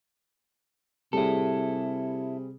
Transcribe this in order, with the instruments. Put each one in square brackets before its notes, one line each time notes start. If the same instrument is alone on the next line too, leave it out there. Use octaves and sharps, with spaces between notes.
[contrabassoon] C3 [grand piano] G3 G#4 [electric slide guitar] E4 A4